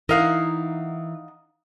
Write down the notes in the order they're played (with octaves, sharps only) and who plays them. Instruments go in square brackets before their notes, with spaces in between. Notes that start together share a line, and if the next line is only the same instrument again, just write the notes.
[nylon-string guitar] E3 E4 A#4 [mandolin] D#4 F5 F#5